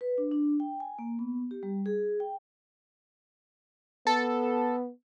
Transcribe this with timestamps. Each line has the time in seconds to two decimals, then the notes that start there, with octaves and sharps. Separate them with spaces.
0.01 B4
0.18 D4
0.32 D4
0.60 G5
0.80 G#5
0.99 A#3
1.19 B3
1.51 G4
1.63 G3
1.86 G#4
2.20 G5
4.07 B3 A4